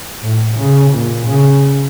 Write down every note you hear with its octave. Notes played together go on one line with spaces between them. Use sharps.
A2
C#3
A#2
C#3